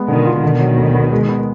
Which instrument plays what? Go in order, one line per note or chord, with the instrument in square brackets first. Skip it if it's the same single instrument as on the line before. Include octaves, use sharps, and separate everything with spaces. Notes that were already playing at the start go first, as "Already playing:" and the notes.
Already playing: [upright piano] G#3 B3
[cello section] B2 D#3 [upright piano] D3
[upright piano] F4
[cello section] B2 D#3 [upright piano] D3
[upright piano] F#3
D2
B3
G#3
B3